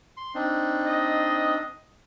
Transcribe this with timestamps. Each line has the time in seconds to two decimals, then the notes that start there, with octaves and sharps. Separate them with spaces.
0.17 C6
0.35 C4 D4 D#4
0.85 D#5